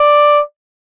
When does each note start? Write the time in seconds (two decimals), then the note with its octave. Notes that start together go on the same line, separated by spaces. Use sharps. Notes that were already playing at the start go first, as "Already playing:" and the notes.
Already playing: D5